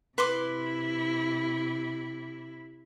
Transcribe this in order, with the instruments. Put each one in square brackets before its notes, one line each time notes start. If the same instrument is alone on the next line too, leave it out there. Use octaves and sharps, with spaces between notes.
[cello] C3 E4 [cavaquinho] B4 C6 D6